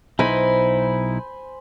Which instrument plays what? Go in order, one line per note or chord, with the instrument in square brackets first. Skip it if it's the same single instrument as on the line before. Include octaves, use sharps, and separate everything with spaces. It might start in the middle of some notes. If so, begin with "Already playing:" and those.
[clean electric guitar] B1 D#4 E4 [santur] C5 G#5 B5